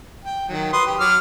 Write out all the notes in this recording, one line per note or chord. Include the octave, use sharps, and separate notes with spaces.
G5
D#3 F#3
B4 C6 D#6
G4
F#3 D6 F6